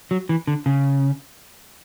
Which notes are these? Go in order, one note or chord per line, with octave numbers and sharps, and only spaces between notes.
F#3
E3
D3
C#3